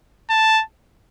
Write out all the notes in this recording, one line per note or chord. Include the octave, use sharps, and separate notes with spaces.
A5